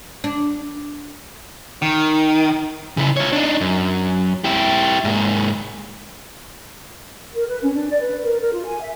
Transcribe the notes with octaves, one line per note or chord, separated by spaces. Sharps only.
D4
D#3
C#3 E4
F4 C#5
D4 D#4
F#2
E4 G4
G#2 A#3
A#4
B4
C#4
D4
D5
B4
A#4
A#4
F4
G#5
E5